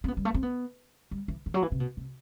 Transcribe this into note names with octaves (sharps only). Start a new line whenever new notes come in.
C4
B3
G3
A3
C4
B3
G3
E3
D#3
F#3
E3
C3
B2
C3